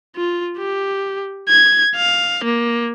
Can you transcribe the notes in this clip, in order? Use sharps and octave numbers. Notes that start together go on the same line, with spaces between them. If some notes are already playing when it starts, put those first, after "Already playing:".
F4
G4
G#6
F5
A#3